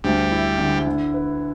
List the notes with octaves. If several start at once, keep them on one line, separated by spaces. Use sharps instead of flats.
D2 G3
E4
D3
D3
B4